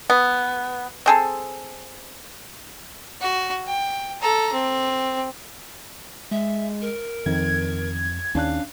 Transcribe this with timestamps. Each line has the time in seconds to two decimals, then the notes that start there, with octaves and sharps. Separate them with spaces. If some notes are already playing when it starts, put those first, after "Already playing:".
0.10 B3
1.06 C4 G#4 A4
3.21 F#4
3.67 G5
4.22 A4 A#5
4.53 C4
6.31 G#3 E5
6.82 A#4
7.26 F2 D#3 G#6
8.35 D#2 C#4 D4 F5 F#6